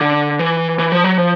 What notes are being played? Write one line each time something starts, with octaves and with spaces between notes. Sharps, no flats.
D3
E3
E3
F3
F#3
F3